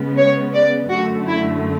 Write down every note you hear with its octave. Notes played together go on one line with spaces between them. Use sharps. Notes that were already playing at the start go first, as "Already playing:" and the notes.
Already playing: C#3 G#3 B3
C#5
D5
F#2 D3 A3 F#4
E4